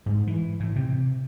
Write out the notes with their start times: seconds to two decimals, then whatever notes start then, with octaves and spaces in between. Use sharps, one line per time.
0.06 G#2
0.27 E3
0.60 A2
0.76 C3